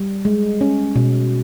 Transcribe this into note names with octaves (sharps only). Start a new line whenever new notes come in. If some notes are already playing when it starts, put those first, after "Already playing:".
Already playing: G3
G#3
C#4
B2